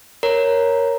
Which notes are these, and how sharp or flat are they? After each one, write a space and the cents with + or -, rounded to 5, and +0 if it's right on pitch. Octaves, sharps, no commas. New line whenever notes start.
A#4 +0 C#5 +0 A#5 +0